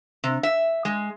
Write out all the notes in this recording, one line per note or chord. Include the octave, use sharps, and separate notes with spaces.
C3
E5
G#3